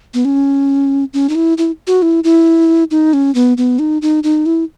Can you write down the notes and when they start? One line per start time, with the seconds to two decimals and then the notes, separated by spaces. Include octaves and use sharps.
0.14 B3
0.25 C#4
1.13 C#4
1.29 D#4
1.35 E4
1.58 E4
1.87 F#4
2.02 E4
2.24 E4
2.91 D#4
3.13 C#4
3.35 B3
3.57 B3
3.79 D#4
4.02 D#4
4.23 D#4
4.46 E4